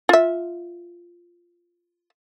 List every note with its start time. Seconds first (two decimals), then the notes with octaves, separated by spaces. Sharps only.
0.09 F4 E5